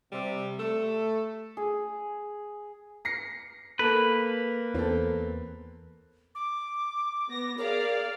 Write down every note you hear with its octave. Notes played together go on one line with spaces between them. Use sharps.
C3 G3
A3 A4
G#4
A#6 C7 C#7
A#3 A4 B4
E2 B3 C4 A4
D6
B3 A#6
G#4 A#4 D5 F5